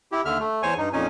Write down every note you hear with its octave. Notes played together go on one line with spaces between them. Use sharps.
E4 G4
D#2 D3 E5 F6
A3
E2 C5 C#5 G#5 C#6
G2 D#4
F2 A#2 C#4 D#4 G#5